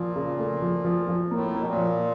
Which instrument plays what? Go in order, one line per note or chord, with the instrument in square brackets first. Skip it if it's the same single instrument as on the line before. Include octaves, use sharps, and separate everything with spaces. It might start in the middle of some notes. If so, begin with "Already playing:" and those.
Already playing: [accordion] A#2 [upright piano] F3
[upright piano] C#3
A3
F3
F3
F3
[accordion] A2 [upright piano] A#3
[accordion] B2 [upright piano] A#3
[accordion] A#2
[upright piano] F3